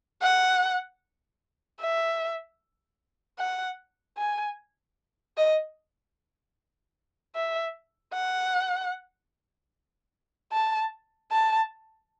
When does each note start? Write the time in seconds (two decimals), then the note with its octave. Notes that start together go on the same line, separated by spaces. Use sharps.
0.22 F#5
1.80 E5
3.39 F#5
4.18 G#5
5.37 D#5
7.36 E5
8.14 F#5
10.52 A5
11.32 A5